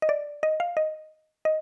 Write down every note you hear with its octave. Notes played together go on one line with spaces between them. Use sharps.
D#5
D5
D#5
F5
D#5
D#5